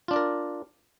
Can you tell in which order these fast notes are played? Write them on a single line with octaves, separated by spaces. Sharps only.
F4 D4 D5 A#4